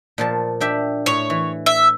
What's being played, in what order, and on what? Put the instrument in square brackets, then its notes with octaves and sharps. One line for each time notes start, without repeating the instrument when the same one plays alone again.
[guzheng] A#2 F3 A5
D4 G4 E5
[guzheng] A2 [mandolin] C#5
[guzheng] E3
[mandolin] E5